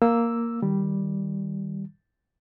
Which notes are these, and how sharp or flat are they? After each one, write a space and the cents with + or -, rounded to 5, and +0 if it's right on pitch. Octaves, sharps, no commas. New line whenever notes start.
A#3 +0 E6 +0
D#3 +0 G3 +0